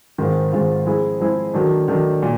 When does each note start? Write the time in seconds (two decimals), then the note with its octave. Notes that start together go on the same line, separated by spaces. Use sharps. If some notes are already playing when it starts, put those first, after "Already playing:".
0.18 G#2 D#3 G#3 C4 F4
0.52 G#2 D#3 G#3 C4 F4
0.86 F3 G#3 C4 E4 G#4
1.20 F3 G#3 C4 E4 G#4
1.54 D#3 F#3 A3 D4
1.88 D#3 F#3 A3 D4
2.23 A#2